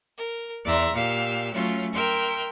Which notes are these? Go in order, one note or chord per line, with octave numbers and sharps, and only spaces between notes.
A#4
E2 D5 E5 A#5 C6
A#2 G4 F5 E6
F#3 A3 C#4 F4
A#4 E5 G5 C6